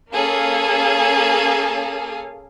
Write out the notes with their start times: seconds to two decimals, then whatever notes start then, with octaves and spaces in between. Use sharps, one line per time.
0.11 A#3 C#4 G#4 A4 F5